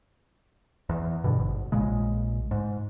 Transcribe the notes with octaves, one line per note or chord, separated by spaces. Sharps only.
E2
G2 B2 D3
G#1
A#1 A#2 C#3 G#3
G#2